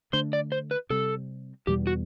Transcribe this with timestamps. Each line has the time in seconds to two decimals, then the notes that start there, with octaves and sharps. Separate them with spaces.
0.13 D3 A3 D4 C5
0.33 D5
0.52 C5
0.71 B4
0.90 C3 G3 C4 A4
1.67 E2 B2 G3 B3 G4
1.87 F#4